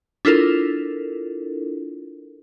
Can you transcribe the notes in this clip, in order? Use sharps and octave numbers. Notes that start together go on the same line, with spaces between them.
D4 E4 F4 A4 A#4